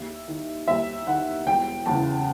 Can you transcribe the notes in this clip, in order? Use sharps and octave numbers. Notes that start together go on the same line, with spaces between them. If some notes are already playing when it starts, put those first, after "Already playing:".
Already playing: D#2 E5
D#3
D#2 E5
D#3 F#5
E1 G5
E2 C#3 A5